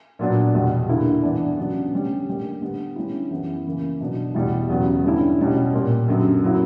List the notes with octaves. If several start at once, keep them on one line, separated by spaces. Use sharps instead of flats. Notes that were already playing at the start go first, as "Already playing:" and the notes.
A#2 F#3 B3 D4
E2 B2 G3
G2 D3 A#3 E4
G2 E3 B3 D4
C#3 F#3 B3 D4
D3 G3 C#4
D3 G3 A#3
D3 G3 B3
D3 G3 C#4 E4
F#2 E3 B3 E4
C#3 E3 A#3
B2 F#3 B3 D4
E2 B2 G3 B3 E4
E2 C#3 F#3 B3
G2 D3 G3 C#4 E4
B2 G3 C#4
A#2 G3 A#3
F#2 D3 F#3 B3
C#3 F#3 A#3 E4